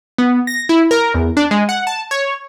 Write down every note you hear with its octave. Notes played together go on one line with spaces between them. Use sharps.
B3
A#6
E4
A#4
E2
D4
G#3
F#5
A5
C#5